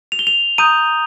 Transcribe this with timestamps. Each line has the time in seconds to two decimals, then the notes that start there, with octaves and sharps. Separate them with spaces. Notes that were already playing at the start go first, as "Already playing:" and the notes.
0.12 F7
0.19 G7
0.27 F7
0.58 A#5 D#6 G6 D#7